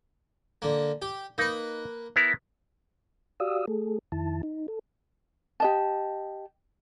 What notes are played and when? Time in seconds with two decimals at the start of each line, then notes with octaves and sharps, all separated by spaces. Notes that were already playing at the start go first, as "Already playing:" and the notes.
0.62 D3 A#3
1.02 G4
1.38 A#3 D#4 B4
2.16 B3 E4 A#4
3.40 F#4 G4 D5 F5 D#6 E6
3.68 A3 G#4 A4
4.12 F2 D#3 E4 A5
4.43 D#4
4.68 A4
5.60 G4 D#5 A5